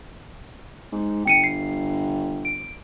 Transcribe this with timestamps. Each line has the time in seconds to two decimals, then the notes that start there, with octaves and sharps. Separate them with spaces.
0.92 G#2
1.26 G1 G5 C#7 D#7
1.44 C7
2.45 D7